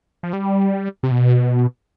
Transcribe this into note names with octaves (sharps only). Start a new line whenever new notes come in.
F3
G3
C3
B2